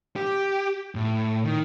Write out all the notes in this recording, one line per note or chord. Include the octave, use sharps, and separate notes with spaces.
G4
A2
D#3